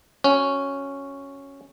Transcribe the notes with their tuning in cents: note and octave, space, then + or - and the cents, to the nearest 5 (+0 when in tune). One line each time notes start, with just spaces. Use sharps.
C#4 +0 F#4 +0